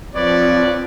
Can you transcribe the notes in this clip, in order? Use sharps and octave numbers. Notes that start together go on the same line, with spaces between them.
F3 C4 B4 C#5 D5